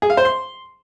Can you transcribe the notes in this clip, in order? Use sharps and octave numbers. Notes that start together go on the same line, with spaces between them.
G#4
F5
C5
C6